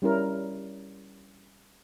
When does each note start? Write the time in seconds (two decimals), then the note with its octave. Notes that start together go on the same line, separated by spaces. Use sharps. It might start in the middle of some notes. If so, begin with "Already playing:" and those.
0.02 G3 C#4 E4 A#4